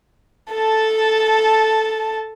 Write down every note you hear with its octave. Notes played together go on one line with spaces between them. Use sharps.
A4 A5